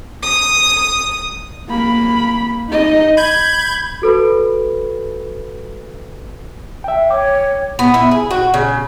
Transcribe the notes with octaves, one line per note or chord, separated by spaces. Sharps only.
D#6
A#3 B5
D#4 D#5
B5 G6 G#6
F#4 A4 B4 B5
E5 G5
C#5 G5 D6
B3
E4
G#4
F#4
C#3